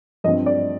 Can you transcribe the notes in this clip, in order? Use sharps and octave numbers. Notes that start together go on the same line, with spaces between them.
G2 F3 C4 D#5
D5